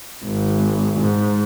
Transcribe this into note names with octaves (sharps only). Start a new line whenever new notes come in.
G#1
G#2